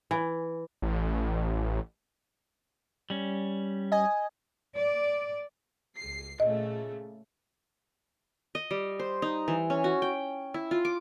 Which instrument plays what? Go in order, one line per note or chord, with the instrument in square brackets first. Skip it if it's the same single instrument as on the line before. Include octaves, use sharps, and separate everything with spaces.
[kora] E3
[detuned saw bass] A1
[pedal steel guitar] G3 C#4
[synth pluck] D#5 G#5
[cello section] D5
[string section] C#2 C7
[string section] A#2 C#3 A3 [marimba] D#5
[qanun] D#5
G3
C5
D#4
E3
C#4
F#4
G5
E4
F4
D6